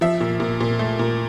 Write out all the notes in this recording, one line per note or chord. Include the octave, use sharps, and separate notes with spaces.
F3 E5
A#2
A#2
A#2
A3
A#2